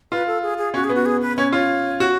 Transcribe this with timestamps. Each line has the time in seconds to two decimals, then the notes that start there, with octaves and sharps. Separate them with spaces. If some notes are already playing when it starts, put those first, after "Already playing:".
0.12 F4 B4
0.27 A4
0.42 G#4
0.58 G#4
0.74 C#4 F#4
0.84 G#4
0.89 B3
0.95 F#4
1.06 G#4
1.22 B4
1.37 C#4 C#5
1.53 F4 C#5
2.00 F#4